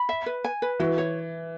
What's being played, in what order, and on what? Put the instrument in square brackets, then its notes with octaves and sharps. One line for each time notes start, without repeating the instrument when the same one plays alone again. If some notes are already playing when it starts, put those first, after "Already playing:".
Already playing: [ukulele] B5
E5
B4
G#5
B4
[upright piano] E3 [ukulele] F#4
[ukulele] C#5